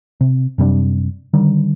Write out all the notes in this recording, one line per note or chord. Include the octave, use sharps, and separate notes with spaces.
C3
F#2 C3 G3 D4
D3 D#3 G3